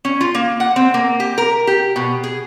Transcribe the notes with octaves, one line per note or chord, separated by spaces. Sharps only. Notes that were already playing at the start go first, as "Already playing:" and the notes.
C#4
F4
A#3
F#5
C4
A#3
G4
A#4
G4
B2
G#4